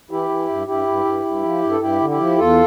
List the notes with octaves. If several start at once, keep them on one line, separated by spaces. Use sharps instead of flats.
E3 E4 G4
E3
G2
G2 E4 G4
G2
G2
G2
F3
G2
A4
G2 E4 G4
D3
E4 G4
F3
E2 F4 A4